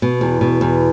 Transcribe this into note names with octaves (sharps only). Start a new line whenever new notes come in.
B2
E2
B2
E2